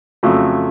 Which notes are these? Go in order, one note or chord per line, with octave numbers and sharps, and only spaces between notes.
F2 C#3 F#3 A3